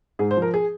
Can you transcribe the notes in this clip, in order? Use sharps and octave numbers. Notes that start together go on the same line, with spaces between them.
G#2 G#4
C5
F3
A#4
G#4